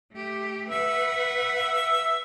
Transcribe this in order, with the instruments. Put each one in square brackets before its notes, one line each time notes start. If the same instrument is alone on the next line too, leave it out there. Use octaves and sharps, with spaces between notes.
[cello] A3 G4
[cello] B4 F#5 [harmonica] E5